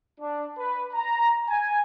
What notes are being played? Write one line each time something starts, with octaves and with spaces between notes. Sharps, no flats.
D4
B4
A#5
G#5